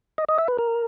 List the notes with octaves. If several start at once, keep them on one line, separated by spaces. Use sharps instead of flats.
D#5
D#5
E5
B4
A#4